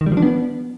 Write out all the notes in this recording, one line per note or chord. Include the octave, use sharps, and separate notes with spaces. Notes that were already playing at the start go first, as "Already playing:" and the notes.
D#3
G3
F3
D4
B3